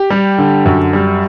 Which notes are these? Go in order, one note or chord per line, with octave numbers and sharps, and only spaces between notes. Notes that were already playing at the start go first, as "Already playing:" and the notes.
Already playing: G4
G3
D3
F#2
G3